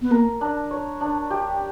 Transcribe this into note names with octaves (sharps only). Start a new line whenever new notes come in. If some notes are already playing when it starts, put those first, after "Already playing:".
B3
A#3 A#4
D4
C#5
D4
G4